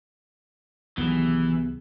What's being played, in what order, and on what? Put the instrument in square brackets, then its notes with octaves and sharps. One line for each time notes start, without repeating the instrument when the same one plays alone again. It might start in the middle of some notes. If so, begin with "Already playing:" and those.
[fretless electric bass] C2 D#3 F#3 [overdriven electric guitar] E3 [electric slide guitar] B3 G4 G#4